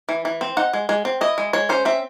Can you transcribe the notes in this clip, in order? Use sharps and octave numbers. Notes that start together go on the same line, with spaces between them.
E3
E3
C4
D#4 F#5
G#3
G#3
C4
E4 D#5
G#3
G#3 C#5
C#4 C5
C4 E5